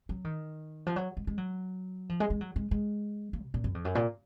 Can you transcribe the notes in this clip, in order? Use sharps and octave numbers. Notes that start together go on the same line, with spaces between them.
F#3
D#3
F3
F#3
G#3
G#3
F#3
F3
G#3
G#3
F#3
G#3
G#3
A#3
B2
A#2
F#2
F2
F#2
A#2